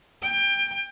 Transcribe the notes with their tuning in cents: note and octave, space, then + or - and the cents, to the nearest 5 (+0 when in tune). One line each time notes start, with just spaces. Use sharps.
G5 +25